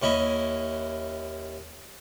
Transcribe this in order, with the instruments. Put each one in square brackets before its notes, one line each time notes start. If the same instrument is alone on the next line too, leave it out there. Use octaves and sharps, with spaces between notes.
[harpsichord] D#2 C#4 E4 D#5